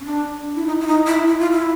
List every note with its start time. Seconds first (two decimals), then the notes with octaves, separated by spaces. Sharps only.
0.01 C#4
0.05 D4
0.56 E4
0.66 D#4
0.80 E4
0.87 D#4
1.06 E4
1.27 E4
1.39 F4
1.51 E4